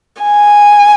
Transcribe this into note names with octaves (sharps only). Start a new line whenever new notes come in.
G#5